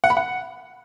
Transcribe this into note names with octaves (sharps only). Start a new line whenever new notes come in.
F#5
B5
F#5